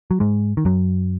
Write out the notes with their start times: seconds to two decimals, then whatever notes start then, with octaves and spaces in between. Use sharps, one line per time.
0.11 F#3
0.20 G#2 G#3
0.57 D#3
0.65 F#2 F#3